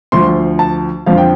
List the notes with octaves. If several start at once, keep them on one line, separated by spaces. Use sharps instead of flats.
D2 D3 F3 C6
A5
F2 D3 F3 F5
G5